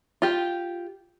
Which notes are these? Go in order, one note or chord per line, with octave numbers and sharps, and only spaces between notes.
F4 G4